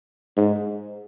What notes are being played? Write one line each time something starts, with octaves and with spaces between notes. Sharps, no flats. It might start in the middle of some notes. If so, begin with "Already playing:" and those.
G#2